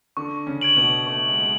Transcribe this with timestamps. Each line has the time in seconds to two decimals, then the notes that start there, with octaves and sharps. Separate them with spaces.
0.17 D3 D4 C#6
0.47 C#3 C#4
0.61 G#6 D7 F#7
0.76 B2 B3
1.06 A3 C#6
1.29 G#3
1.41 G#3